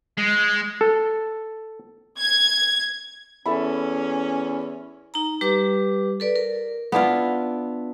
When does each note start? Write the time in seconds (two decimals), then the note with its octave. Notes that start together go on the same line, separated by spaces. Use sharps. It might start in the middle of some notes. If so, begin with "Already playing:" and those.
0.18 G#3
0.81 A4
2.19 G#6
3.46 E2 C#4 A4 E5 B5
5.14 D#4 A#5
5.41 G3 G4 B4 D6
6.20 A4 B4 D5
6.36 A#4
6.92 B3 D4 E4 F4